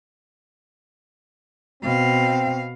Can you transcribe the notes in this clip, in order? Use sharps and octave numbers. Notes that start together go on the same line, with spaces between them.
B2 C4 F5